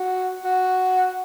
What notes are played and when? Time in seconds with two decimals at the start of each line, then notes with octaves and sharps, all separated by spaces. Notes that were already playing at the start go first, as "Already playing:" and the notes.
Already playing: F#4
0.44 F#4